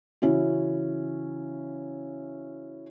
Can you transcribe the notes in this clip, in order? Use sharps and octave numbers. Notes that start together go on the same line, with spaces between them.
C#3 E3 C#4 E4 F#4